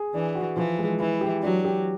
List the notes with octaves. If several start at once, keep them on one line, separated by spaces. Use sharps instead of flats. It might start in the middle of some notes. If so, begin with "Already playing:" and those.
Already playing: G#4
E3 D4
F#4
E3 F3
G#3
E3 E4
G4
F#3 D4
G4